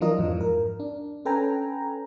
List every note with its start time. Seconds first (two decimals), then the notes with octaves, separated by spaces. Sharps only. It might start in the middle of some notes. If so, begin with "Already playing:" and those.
0.01 E3 F#3 D4 F4 A#4 D#5
0.18 F2 G#2 F3
0.41 A#4
0.80 D4
1.25 C#4 A4 B4 G5 G#5 A#5